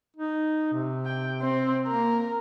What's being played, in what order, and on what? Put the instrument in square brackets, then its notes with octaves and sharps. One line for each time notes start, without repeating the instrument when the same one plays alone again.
[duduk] D#4
C3
[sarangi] G5
C4
[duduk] A#3 [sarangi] A#4